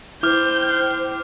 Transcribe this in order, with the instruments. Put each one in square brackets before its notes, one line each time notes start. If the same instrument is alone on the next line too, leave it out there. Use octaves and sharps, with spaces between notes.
[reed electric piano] E4 [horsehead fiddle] C5 G5 [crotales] D6 F6 [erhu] G6